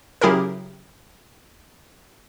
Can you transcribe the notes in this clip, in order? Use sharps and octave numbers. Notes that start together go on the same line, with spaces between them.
C#3 F#3 E4 G4 G#4 A#4